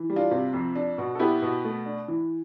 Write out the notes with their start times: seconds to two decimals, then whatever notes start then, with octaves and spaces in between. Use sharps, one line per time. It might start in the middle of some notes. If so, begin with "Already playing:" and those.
Already playing: E3
0.10 G3
0.16 D4 F4
0.31 C3
0.53 F2
0.75 D4
0.98 B2
1.15 A4
1.19 B3 E4 G4
1.42 B2
1.65 A3
1.86 D4
2.08 E3